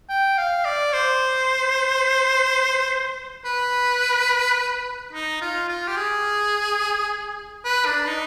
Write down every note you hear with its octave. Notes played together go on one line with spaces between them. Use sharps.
G5
F5
D5
C5
B4
D#4
F4
F4
G4
G#4
B4
D4
D#4